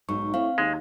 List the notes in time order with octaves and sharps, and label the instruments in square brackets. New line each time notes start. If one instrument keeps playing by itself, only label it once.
[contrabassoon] B1 [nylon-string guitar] G#2 [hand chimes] C#6
[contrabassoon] A2 [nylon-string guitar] C4 [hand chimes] F5
[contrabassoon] D#2 [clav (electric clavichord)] G#3